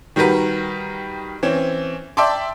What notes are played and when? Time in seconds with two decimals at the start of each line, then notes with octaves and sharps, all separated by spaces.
0.16 D#3 G3 F#4 A#4 B4
1.43 E3 C4 C#4
2.17 D5 E5 G5 A5 C6 D6